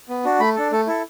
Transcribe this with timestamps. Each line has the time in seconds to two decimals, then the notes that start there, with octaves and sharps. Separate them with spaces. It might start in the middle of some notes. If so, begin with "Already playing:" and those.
0.09 B3
0.25 D4 F#4
0.40 A3 B5
0.56 D4 A4
0.72 A3 A4
0.87 E4 A4